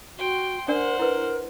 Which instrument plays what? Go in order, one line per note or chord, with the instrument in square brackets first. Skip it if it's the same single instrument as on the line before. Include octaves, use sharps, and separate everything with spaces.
[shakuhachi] F#4 [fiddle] G5 C6
[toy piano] D4 D5 G#5 [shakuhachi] A#4 [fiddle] C5 F#5
[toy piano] E4 B4 [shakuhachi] A#4